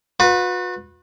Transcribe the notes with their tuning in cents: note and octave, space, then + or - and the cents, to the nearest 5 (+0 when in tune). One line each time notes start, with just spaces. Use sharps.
F#4 -45 B4 +0